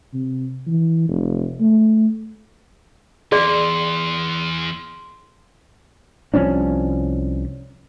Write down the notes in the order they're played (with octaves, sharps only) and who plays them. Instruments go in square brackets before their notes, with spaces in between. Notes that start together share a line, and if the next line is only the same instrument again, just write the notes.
[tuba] C3
E3
F1
A3
[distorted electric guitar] E2 [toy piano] G#4 D5 [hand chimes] C6
[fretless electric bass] C2 F3 C#4 D4